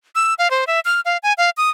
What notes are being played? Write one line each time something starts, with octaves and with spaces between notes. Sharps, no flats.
E6
F5
C5
E5
F6
F5
G#5
F5
D#6